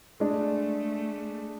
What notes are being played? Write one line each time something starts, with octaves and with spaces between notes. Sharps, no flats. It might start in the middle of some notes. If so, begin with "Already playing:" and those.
G#3 A3 D4 G#4 D5